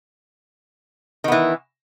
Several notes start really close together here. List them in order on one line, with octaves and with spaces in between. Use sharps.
D#3 B3 E3